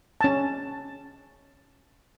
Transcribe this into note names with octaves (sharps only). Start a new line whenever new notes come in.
C#4 A5